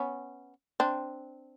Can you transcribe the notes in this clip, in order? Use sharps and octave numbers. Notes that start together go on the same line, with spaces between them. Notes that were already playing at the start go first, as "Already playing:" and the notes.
Already playing: B3 C#4
C4 D4